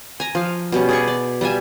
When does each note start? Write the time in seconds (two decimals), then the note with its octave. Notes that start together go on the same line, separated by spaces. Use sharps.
0.20 G#5 A#5
0.35 F3 F5
0.72 B2 G3 C#4
0.89 G#4 D5 C#6
1.08 D5
1.41 G3 F4 E5 G#5